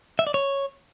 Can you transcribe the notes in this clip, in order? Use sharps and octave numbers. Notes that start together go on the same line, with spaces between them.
E5
D5
C#5